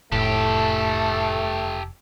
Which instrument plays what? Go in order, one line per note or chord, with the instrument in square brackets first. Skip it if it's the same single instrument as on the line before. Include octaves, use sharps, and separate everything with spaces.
[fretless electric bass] F1 [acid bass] A2 [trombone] A3 [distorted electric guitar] G4 A4